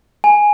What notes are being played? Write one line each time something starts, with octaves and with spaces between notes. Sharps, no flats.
G#5